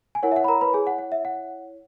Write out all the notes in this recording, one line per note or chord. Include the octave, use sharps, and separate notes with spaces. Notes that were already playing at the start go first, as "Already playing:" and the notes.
G#5
E4 A#4 C#5 F#5
E5
F#5
B5
A#4 A#5
B4 B5
G#4 G#5
F#5
F#5
E5
F#5